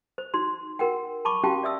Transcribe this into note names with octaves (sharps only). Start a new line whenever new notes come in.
C5
D#4 F#4 C6
F#4 A#4 F#5 G5
A5 B5 C#6 D6
C#4 F#4 G4 F5 G5 A5
D5 E5 D#6 E6